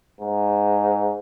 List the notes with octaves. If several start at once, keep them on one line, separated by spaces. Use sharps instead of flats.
G#2